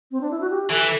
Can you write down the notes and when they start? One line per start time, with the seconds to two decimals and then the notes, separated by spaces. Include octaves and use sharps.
0.11 C4
0.21 D4
0.31 E4
0.41 F#4
0.50 G4
0.70 E3 A4